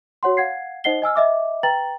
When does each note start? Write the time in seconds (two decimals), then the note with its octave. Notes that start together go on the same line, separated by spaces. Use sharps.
0.23 F#4 C#5 F#5 C6
0.37 F5 F#5 G#6 C7
0.84 D#4 C5 D#5 F#5 C7 G7
1.02 D#5 G#5 E6 F6
1.16 D#5 E5 D6
1.63 B4 G5 A#5 A6 F#7